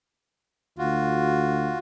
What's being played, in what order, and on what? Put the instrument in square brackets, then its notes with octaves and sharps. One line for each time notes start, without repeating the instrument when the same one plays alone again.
[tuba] D2 [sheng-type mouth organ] F4 F#4